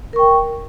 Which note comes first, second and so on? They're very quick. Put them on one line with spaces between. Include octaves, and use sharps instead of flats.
A#4 C#6 G5